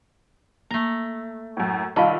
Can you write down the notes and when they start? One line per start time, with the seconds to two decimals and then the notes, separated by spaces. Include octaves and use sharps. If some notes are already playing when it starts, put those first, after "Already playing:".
0.71 A3 A#3 A#5
1.57 F#2 A2
1.96 C2 D#3 D#4 F4 D#5 F5 A5 B5